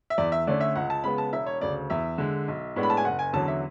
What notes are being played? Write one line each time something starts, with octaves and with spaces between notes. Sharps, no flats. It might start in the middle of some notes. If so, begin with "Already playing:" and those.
E5
E2 D5
E5
D3 A3 C#4 D5
E5
C#2 F#5
A5
C#3 G#3 B3 B5
A5
E1 E5
C#5
D2 C#3 D5
E2 E5
D3 G#3
B1
A2 G#3 B3 D4
B5
A5
G#5
F#1 F#5
G#5
E2 D3 F#3 C#4 A5
E5